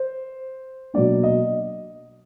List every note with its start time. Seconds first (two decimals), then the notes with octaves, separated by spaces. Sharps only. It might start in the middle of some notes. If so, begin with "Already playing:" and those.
Already playing: C5
0.94 B2 F#3 A#3 D4 D5
1.23 D#5